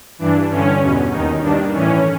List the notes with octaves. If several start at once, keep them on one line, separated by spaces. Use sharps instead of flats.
G2 E3 D4
G2 D3 C#4
E2 B2
D#2 D#3 D#4
G2 D#3 D4
A2 E3 C#4